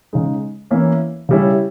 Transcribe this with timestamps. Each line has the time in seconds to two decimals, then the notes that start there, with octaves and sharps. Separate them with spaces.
0.13 C#3 G#3 D#4
0.71 E3 A#3 C#4 E4
1.29 C#3 G3 C#4 E4